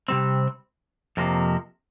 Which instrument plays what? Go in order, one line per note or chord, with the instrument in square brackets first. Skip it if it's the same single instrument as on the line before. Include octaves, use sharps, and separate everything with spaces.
[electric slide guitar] C3 G3 C4
F2 C3 F3 A#3